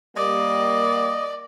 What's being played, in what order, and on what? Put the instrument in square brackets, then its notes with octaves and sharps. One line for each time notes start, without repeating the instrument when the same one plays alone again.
[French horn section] G3 A#3 [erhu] D5 [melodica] D#5